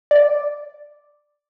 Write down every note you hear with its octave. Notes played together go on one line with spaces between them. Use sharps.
D5